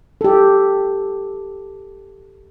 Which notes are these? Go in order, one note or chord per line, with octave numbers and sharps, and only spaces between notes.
G4 A4